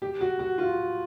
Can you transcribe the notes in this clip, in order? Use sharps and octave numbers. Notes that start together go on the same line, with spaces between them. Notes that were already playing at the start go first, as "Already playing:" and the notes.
G4
F#4
F#4
F4